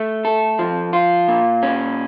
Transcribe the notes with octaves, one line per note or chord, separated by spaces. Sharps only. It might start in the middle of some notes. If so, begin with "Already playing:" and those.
Already playing: A3
A4
F3
F4
A#2
C#4